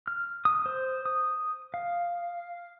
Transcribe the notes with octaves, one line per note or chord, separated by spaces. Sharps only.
F6
D#6
C5
D#6
F5